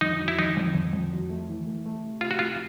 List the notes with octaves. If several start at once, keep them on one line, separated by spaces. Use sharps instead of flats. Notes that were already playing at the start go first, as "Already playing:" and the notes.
F2 D#4
F#3
E4
F2 D#4
F2
F2
F2
F#3
A3
E3
A3
A3
C3
C3 F4
F#4
A3 F4